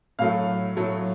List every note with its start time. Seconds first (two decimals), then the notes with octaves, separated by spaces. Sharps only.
0.19 A2 F#3 A3 F5
0.76 A2 F#3 A3